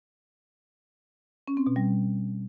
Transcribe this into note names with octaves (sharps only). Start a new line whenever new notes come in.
C#4
C4
B2
G3